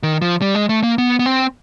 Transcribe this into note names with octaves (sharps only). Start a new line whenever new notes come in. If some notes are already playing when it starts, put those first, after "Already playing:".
D#3
F3
G3
G#3
A3
A#3
B3
B3
C4